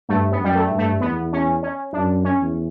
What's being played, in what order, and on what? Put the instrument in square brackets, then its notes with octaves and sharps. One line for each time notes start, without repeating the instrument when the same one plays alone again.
[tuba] G2 [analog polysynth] A3
[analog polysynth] B3
[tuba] F#2 [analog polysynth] G3
[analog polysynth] A3
[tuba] G2
[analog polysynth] A3
[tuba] E2 [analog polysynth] B3
[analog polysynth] C#4
C#4
[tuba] F#2 [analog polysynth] D4
[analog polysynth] C#4
[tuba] E2